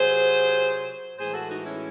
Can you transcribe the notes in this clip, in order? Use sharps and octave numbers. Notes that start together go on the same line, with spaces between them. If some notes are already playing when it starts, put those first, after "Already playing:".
Already playing: C3 F#3 G#4 C5
A2 E3 G#3 G#4 C5
F#4 A4
D#4 F#4
C#4 E4